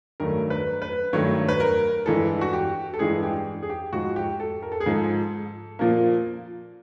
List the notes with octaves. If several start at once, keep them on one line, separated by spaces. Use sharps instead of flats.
G2 D#3 F#3 A3 A#4
B4
B4
G2 D#3 F#3 A3 C#5
B4
A#4
G2 E3 G#3 A4
F#4
G4
A4
G2 E3 G#3 G#4
G4
G#4
G4
G#2 F3 G#3 F#4
G4
A4
A#4
A4
G#4
G#2 F3 G#3 A4
A#2 F3 A#3